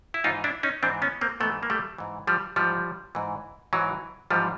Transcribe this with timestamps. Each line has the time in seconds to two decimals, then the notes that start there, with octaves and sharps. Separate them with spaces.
0.14 E4
0.24 G#2 E3 D#4 F4
0.44 D4 E4
0.63 C#4 D#4
0.83 G#2 E3 C4 D4
1.02 B3 C#4
1.21 A#3 C4
1.40 G#2 E3 A3 B3
1.63 A#3
1.70 G3 A3
1.98 G#2 E3
2.27 F3 G3
2.56 G#2 E3 F3 G3
3.15 G#2 E3
3.73 G#2 E3 F#3
4.31 G#2 E3 F3 G3